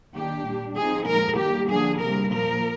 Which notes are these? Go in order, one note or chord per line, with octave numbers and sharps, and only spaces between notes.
D#3 A#3 D4 G4
A#2 G3 D4
F3 C4 D#4 G#4
A#2 F3 G#3 A#4
D#3 G3 A#3 G4
D3 F3 A#3 D4 G#4
C3 G3 A#3 A#4
A#2 F3 A#3 A#4